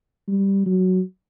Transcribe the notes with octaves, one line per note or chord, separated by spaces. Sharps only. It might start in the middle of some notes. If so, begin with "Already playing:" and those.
G3
F#3